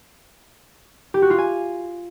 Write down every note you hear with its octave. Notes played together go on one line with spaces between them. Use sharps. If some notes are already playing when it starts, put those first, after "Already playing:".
G4
F#4
F4
G#5